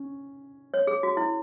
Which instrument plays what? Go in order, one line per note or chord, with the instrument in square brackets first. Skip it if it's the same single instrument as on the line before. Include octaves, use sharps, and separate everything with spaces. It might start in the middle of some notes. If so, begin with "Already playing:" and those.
Already playing: [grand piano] C#4
[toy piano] C#5
G#4
F#4
E4